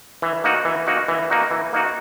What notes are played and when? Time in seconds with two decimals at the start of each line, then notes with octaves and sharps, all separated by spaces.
0.22 E3
0.44 A#3 D#4 F#4
0.65 E3
0.87 A#3 D#4 F#4
1.08 E3
1.30 A#3 D#4 F#4
1.51 E3
1.73 A#3 D#4 F#4